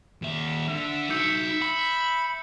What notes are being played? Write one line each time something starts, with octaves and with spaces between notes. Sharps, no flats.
D#2 E5
D3 E5
D#4 F#4 E6 G6 C#7
B5